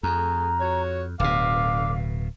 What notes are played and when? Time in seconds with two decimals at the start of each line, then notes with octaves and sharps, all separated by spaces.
0.03 F2 A3 G#4 A4 A#5
0.60 F#4 C#5
1.20 D1 D2 B2 D3 F5 D6